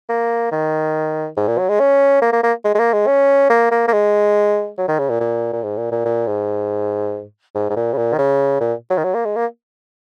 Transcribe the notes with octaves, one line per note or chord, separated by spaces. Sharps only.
A#3
D#3
G#2
A#2
F#3
G#3
C#4
A#3
A#3
A#3
G#3
G#3
A#3
G#3
C#4
A#3
A#3
A#3
G#3
F#3
D#3
C#3
A#2
A#2
A#2
G#2
A#2
A#2
A#2
G#2
G#2
G#2
A#2
C#3
A#2
D#3
C#3
A#2
F#3
D#3
F#3
A#3
G#3
A#3